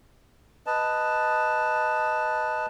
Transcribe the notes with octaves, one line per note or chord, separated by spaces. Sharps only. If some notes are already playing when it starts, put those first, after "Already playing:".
B4 D#5 A5